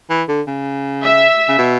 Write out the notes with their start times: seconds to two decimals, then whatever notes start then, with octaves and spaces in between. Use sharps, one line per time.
0.10 E3
0.29 D3
0.47 C#3
1.03 E5
1.49 C#3
1.58 B2